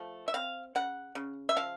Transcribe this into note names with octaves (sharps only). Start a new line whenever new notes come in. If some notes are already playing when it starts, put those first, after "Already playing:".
Already playing: F3 A3
E5
C4 F5
C#3 F#5
C#3
E5
F3 F5